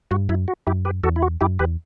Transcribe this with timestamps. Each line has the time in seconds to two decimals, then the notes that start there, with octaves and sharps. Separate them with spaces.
0.11 G2 F#4
0.29 F#2 E4
0.48 F#4
0.67 F#2 E4 G4
0.85 G4 B4
1.03 E2 F#4 A4
1.16 E4
1.22 F#4
1.41 F#2 E4 G4
1.59 E2 G4 B4